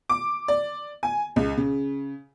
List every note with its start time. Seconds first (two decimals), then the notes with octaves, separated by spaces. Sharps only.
0.09 D6
0.48 D5
1.03 G#5
1.36 C#2
1.57 C#3